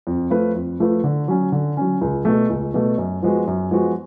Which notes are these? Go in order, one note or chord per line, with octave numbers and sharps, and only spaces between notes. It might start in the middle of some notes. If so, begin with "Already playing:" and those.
F2
F3 A3 F4 B4
F2
F3 A3 F4 B4
D3
F#3 C#4
D3
F#3 C#4
C#2
B2 A3
C#2
B2 A3
F#2
F3 G#3 B3 F#4
F#2
F3 G#3 B3 F#4